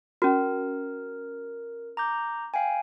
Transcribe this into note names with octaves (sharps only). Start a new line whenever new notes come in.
C#4 F#4 A#4
A#5 D6 G6
F5 G5 G#5